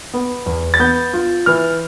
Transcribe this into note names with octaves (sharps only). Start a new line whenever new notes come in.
B3
E2
A6
B3 G6
F4
E3 F6